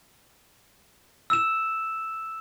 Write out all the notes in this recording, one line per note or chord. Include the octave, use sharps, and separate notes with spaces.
E6 E7